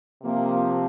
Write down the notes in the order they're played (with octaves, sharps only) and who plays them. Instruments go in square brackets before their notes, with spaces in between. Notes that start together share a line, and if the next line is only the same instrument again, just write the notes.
[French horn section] C3 F3 A#3